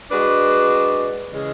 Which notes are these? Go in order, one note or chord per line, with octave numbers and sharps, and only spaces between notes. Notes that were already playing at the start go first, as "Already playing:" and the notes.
G#3 D4 F#4 B4
C#3 E3 G#3 C#4 G#4